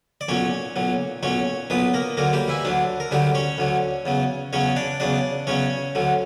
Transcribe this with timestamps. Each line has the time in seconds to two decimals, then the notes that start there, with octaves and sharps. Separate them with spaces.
0.21 D5
0.28 B1 A#2 F#3 C#4 C#5
0.76 B1 A#2 F#3
1.23 B1 A#2 F#3 C#4 C#5
1.70 B1 A#2 F#3 B3 B4
1.94 A#3 A#4
2.17 D2 D3 F#3 A#3 A#4
2.33 G3 G4
2.48 E3 E4
2.65 D2 D3 F#3 D4
3.00 A#4
3.11 D2 D3 F#3 G3 G4
3.35 C#4 C#5
3.58 D2 D3 F#3
4.06 E2 C#3 F#3
4.53 E2 C#3 F#3 C#4 C#5
4.76 D4 D5
5.00 E2 C#3 F#3 D4 D5
5.47 E2 C#3 F#3 C#4 C#5
5.95 D2 D3 F#3